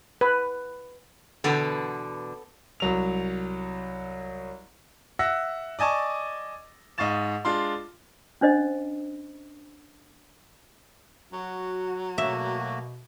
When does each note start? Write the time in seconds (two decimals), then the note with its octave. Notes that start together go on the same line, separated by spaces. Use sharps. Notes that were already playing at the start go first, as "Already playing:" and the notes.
0.21 B4
1.44 E2 B2 D3 B3 A4 D5
2.80 C2 F#3 F7
5.19 E5 F#5 E6 A#6
5.79 D5 D#5 G#5 A5 C#6
6.98 G#2 D#5 F5 C#6 A6 E7
7.45 G#3 D4 F4 C6
8.41 C#4 D4 C5 D#5
11.33 F#3 F#4
12.18 B2 A3 A#3 F#4 E5